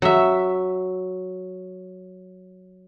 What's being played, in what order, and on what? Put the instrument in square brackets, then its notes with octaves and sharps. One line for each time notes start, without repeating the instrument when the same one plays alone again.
[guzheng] F#3 E5